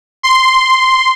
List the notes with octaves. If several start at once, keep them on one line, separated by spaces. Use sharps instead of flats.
C6